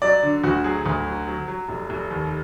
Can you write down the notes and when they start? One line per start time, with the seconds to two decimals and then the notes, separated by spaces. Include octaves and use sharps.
0.02 F#3 D5
0.23 D3
0.44 D2 F#4
0.64 F#3 G#4
0.86 D2
1.07 F#3
1.27 F#3
1.48 F#3
1.69 F1
1.90 F1
2.10 D#2